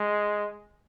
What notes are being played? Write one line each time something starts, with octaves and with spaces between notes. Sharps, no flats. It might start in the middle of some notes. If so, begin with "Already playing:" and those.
Already playing: G#3